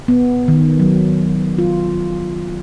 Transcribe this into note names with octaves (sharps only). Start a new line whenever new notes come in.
B3
D#3
F#3
F4